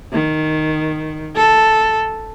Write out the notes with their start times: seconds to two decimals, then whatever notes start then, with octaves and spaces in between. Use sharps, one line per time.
0.12 D#3
1.36 A4